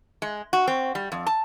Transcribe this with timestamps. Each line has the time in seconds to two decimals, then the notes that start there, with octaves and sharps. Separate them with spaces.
0.22 G#3
0.53 F#4
0.68 C4
0.95 G3
1.12 F2
1.27 A5